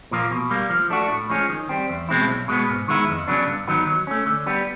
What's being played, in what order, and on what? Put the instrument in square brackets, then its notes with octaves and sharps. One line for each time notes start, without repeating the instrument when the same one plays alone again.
[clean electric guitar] A#2 F3 A#3
B2
G3 A#3
F3
A3 D4 F#4
A2
F3 G#3 C#4
D#3
G3 C4
E2
B2 G#3 C4 E4
B1
B2 G#3 B3
G#2
D#3 G#3 B3 E4
F2
C#3 F#3 B3 D4
G2
D#3 F#3 B3 D#4
F#3
A3 C#4
D3
G3 B3